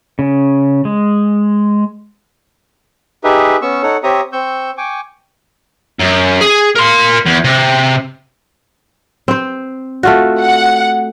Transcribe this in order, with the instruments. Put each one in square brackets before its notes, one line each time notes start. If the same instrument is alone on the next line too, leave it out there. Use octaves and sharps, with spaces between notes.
[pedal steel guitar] C#3
G#3
[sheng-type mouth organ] D#4 G4 G#4 B4 E5
B3 C#4 C#6 E6
D#4 A4 C#5 F#5
C4 G4 C#5 E5 A#5 D#6
C4 C#6 E6 G6
G5 G#5 C#6 D6
[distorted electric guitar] F#2
G#4
A#4 C6
E2
C3
[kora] C4 C5
A3 F4 F#4
[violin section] F#5